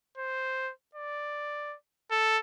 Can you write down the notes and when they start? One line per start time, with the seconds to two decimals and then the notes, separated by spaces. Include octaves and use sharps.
0.18 C5
0.95 D5
2.11 A4